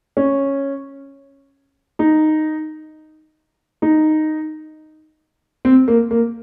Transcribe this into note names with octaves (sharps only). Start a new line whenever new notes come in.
C#4
D#4
D#4
C4
A#3
A#3